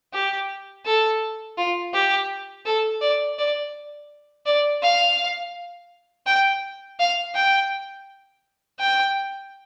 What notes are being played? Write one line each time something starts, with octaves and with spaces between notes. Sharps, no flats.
G4
A4
F4
G4
A4
D5
D5
D5
F5
G5
F5
G5
G5